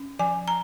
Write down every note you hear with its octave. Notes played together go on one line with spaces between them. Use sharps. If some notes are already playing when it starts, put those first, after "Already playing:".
Already playing: C#4
F3 G#5
A#5